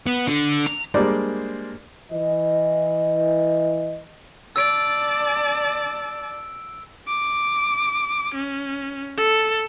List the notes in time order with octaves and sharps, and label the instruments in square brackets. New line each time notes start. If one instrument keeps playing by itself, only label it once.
[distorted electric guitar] B3
D3
A#5
[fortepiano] G3 G#3 A#3 D4 C5 D5
[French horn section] E3 D#5
[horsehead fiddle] D5 A5 [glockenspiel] E6 D7
[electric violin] D6
C#4
A4